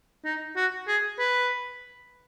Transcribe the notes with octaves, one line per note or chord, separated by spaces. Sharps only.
D#4
F#4
G#4
B4